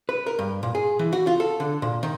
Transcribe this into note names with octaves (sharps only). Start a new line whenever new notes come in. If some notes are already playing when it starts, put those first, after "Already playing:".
B4
A#4
G2
A#2
G#4
E3
F#4
F4
A4
D3
A#2
D#3